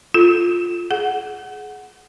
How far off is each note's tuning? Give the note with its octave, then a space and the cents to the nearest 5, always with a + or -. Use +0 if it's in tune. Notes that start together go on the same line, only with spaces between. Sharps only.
F4 +0 A4 +0
G#4 +25 F#5 +0